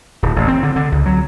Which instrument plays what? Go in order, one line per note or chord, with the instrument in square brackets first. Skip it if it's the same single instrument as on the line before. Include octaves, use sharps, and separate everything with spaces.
[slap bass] D1
A1
C4
D3
D3
C#2
F#3